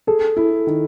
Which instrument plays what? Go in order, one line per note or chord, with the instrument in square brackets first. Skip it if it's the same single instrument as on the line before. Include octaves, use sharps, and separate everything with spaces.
[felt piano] G#4 [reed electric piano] A4
[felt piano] E4
D#3